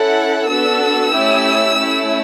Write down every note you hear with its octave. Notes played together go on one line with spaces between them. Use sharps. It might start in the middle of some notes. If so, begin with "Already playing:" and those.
Already playing: C#4 E4 A4 F#5
B3 D4 F#4 A4 E6
A3 C#4 E4 G4
A3 C#4 E4